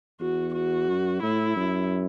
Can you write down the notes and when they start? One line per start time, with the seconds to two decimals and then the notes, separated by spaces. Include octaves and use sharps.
0.20 E2 F#4
0.54 F#4
0.88 F#2
1.23 A2 E4
1.56 F#2